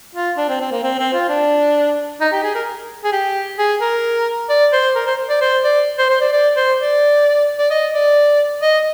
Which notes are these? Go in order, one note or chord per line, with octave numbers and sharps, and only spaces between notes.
F4
D4
C4
C4
A#3
C4
C4
F4
D4
D#4
G4
G#4
A#4
G#4
G4
G#4
A#4
D5
C5
A#4
C5
D5
C5
D5
C5
C5
D5
D5
C5
D5
D5
D#5
D5
D#5